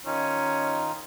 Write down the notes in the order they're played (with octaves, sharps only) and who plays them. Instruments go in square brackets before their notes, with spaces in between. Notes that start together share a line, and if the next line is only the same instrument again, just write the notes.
[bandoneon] D#3 D#4 F4 [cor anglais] C#4